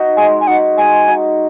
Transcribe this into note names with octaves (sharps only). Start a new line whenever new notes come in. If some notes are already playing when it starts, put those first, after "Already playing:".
Already playing: D#4 F#4
G#3 G#5
G#5
D#4 F#4 F#5
G#3 G#5
D#4 F#4